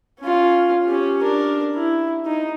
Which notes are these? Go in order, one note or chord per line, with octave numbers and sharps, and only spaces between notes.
C#4 F4
C#4 G4
D4 A#4
E4
D#4